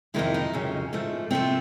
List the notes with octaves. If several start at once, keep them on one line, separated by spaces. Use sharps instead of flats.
F2 C3 D#3 G#3 E4
D#4
F2 C#3 F#3
G#2 F3 A3
C3 F3 A3 C4